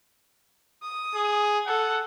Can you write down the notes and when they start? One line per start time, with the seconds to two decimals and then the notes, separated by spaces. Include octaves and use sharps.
0.83 D#6
1.15 G#4
1.67 A4 F#5